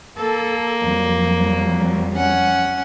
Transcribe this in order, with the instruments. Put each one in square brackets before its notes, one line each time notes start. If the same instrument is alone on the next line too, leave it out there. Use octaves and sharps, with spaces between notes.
[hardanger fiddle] A#3 [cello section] A4
[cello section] F2 F#3 G3
[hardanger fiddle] C#4 F#5